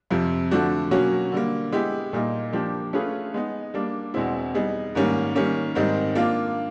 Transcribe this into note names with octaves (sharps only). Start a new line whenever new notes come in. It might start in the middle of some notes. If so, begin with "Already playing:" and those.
F2 C3 F3
D3 F3 A3 D4 F#4
B2 F#3 A#3 C#4 F#4
D3 G3 A#3
G#3 B3 E4 G4
A#2 G3 A#3 D#4
F3 A#3 D4 G4
A3 C#4 F4 G#4 B4
G#3 B3 D#4
G3 A#3 D4
E2 B2 G#3 C4 E4
G3 B3 D#4 G#4
G#2 D#3 G3 A#3 C#4
D#3 G3 A#3 C#4
G#2 D#3 G3 C4 D#4
A#3 D4 F4